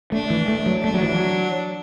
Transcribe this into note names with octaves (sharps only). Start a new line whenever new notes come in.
A3 D4
E3
A3
F#3
A3 D4
F#3
E3
F#3